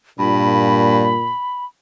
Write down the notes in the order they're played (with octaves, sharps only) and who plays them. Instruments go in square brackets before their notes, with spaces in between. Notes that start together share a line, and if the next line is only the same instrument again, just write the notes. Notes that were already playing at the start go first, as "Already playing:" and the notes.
[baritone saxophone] G2 [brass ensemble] A#2 [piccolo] B5